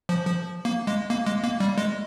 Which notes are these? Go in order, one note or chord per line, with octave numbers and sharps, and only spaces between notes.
F3
F3
A#3
G#3
A#3
G#3
A#3
G3
G#3